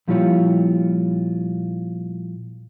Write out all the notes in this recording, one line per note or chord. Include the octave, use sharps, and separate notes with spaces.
A#2 F3 G3 E4 F4 C#5